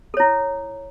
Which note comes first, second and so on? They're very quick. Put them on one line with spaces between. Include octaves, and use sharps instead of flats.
A4 C#5 E4